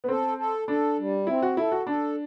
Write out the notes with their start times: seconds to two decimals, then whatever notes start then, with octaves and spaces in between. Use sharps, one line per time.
0.04 B3
0.09 C4 A4
0.38 A4
0.68 D4 A4
0.98 G3
1.27 C4 E4
1.42 F#4
1.57 E4 A4
1.72 F#4
1.87 D4 A4